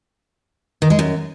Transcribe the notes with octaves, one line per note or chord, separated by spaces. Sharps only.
D#3
G#3
F#2